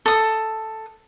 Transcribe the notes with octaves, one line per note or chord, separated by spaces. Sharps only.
A4 D#6